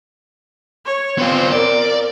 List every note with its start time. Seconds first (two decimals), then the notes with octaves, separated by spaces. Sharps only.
0.85 C#5
1.18 B3 C4 F4 C5
1.52 A#4 D5